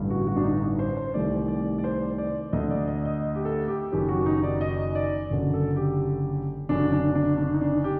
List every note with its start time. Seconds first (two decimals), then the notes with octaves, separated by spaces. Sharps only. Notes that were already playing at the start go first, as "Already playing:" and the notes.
Already playing: A1 G2 D3
0.10 F#4
0.27 F#4
0.36 D4
0.44 D#4
0.79 C5
0.97 C5
1.14 C2 C3 D#3 A3 D5
1.48 D5
1.78 D5
1.84 C5
2.18 D5
2.53 D2 D3 A3 D#5
2.70 D5
2.87 D#5
3.05 D#5
3.35 G4
3.45 A4
3.68 G4
3.92 F#1 F#2 D#3 F#3 G4
4.09 F#4
4.26 D#4
4.43 D5
4.61 D#5
4.95 D5
5.30 F#1 F#2 D3
5.54 A4
5.76 G4
6.69 F#1 F#2 D3 D4
6.92 D4
7.15 D4
7.38 D4
7.54 D#4
7.61 D4
7.84 G4